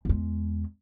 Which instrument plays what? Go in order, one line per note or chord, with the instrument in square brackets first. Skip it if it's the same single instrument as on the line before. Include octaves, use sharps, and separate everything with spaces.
[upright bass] E2 G#3